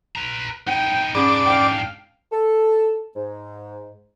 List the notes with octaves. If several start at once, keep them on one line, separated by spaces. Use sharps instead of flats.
B4 A#5
B3 D#4 G5
G#2 C#4 D4 G#4 D5 B5
F5 G5
A4
G#2